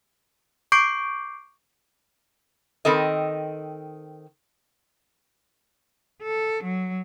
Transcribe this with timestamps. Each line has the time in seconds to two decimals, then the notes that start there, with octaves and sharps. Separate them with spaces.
0.72 C#6 D6 G6 C7 D7
2.85 D#3 C4 A4 D#5
6.22 A4
6.64 F#3